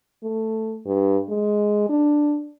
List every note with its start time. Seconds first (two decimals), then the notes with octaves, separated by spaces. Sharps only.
0.23 A3
0.86 G2
1.29 G#3
1.89 D4